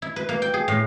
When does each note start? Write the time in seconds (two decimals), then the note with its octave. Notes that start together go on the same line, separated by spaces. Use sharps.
0.02 E4
0.16 B4
0.29 A#3
0.42 G5
0.54 G#4
0.68 A2